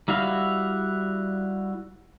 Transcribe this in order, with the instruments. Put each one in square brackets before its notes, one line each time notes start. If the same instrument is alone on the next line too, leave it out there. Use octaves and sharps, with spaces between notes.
[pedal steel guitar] G3 E4 F#4 F5